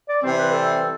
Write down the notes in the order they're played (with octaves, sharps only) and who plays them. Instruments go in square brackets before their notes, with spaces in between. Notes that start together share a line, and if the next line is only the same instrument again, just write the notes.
[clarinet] D5
[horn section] C3 E3 G3 C4 [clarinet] C5
[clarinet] B4
A4